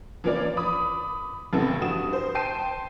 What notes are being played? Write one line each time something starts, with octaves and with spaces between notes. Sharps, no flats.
E3 F3 A#3 C#4 F4 D5
B5 D6 D#6
A1 F2 C#3 B3 E4 A4
G2 F#4 D#6 E7
C5
G5 A5 C6 G6 C7 D#7